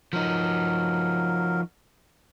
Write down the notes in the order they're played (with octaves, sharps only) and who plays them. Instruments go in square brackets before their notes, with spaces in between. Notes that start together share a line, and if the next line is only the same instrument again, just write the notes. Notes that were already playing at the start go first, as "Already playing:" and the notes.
[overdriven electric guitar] F3 D#4 [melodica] F#3 A#4